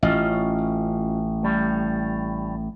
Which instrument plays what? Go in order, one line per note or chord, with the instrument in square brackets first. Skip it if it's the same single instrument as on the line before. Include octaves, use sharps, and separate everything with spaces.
[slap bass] A1 [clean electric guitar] C#4 F4 D#5
[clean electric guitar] A2 G3